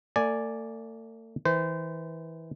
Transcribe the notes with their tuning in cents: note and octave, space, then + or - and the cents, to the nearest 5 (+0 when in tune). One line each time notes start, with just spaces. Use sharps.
A3 +40 D5 +0 G#5 +0
E3 -25 C5 -30